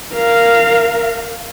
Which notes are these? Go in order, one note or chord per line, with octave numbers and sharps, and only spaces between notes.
A#4 F5